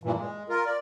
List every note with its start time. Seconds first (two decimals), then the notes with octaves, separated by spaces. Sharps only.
0.04 G2 A#2 E3
0.17 G#3
0.49 F4 A#4
0.66 D5